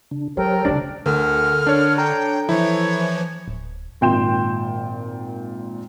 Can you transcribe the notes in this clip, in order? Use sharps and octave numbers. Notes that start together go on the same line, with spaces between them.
C#3 D4
F#3 G4 A4 A#4 C5 C#5 G5
C2 C#3 D4
D2 D3 A4 A#4 F6
D4 C#5
A4 G5 A#5
E3 F3 E4 C#5
D1
G#1 A#2 G5 C6 G6 E7